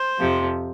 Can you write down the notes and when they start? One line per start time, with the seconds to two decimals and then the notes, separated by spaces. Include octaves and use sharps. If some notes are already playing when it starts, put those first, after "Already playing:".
Already playing: C5
0.19 F2 C3 F3